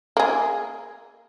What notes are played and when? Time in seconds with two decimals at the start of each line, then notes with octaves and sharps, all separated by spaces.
0.17 A#3 G#4